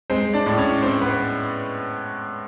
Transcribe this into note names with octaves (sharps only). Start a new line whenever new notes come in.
G#3 C4 C5
D4 D5
A2
C#4 C#5
A2 C4 C5
B3 B4